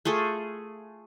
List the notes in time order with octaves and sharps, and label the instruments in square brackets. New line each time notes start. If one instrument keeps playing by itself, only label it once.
[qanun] A3 F4 G#4 A4